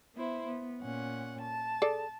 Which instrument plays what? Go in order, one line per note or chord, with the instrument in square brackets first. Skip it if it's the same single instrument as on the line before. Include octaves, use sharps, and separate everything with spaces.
[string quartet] B3 E4 C5
B3
A#2 C#4 F#5
A5
[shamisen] G#4 A4 D5